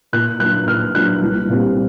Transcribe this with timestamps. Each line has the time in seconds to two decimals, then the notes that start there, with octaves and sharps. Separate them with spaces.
0.13 A#2 F#6
0.40 F#3 A#3 D4 F#6
0.67 A#2 F6
0.95 F#3 A#3 D4 F#6
1.22 C2
1.49 A#2 G3 C4